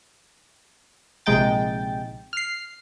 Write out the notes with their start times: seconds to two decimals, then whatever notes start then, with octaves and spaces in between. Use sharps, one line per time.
1.26 A#1 C3 G#3 D#4 G5 A6
2.33 F6 C7